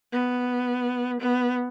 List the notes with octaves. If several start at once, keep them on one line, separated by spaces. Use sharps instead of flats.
B3
B3